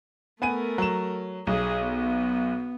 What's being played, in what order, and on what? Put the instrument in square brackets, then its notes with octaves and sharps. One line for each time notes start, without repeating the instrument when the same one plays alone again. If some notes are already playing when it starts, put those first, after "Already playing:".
[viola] A3 A#4 [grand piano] B3 G#5 D#7
[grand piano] F#3 E7
[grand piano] B1 [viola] G#4
[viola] B3